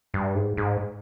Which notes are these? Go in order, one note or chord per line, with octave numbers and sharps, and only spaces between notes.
G2
G#2
G#2